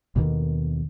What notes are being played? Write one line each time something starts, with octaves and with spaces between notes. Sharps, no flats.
D#2 B2 D3 D#3